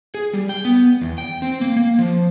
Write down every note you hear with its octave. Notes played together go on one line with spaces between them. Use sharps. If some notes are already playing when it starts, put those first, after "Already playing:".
G#4
G3
G5
B3
E2
G5
C4
A#3
A#3
F3